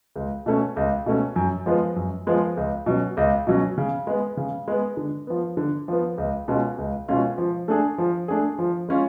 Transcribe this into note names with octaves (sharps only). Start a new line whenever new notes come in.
C#2
B2 A3 C#4
C#2
B2 A3 C#4
F#2
F3 G#3 B3
F#2
F3 G#3 B3
C#2
B2 F#3 C#4
C#2
B2 F#3 C#4
C#3
G#3 B3
C#3
G#3 B3
D3
F3 B3
D3
F3 B3
C#2
B2 G#3 C#4 F4
C#2
B2 G#3 C#4 F4
F3
A3 D4 G#4
F3
A3 D4 G#4
F3
G#3 C#4 F4